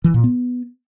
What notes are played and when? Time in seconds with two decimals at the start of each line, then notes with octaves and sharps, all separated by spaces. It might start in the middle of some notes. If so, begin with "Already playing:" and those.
0.04 E3
0.14 A#2
0.24 B3